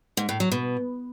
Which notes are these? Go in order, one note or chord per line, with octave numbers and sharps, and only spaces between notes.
G#2
A2
F#3
B2